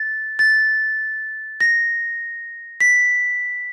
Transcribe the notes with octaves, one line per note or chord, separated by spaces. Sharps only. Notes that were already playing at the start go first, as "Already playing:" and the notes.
Already playing: A6
A6
A#6
B6